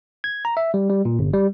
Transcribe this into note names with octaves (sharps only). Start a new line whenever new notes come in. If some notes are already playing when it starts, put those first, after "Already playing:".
G#6
A#5
E5
G3
G3
A#2
G1
G3